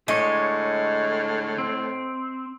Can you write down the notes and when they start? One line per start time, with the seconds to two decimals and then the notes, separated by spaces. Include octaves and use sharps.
0.08 A2 D3 G#3 C#5 D#5
1.58 C4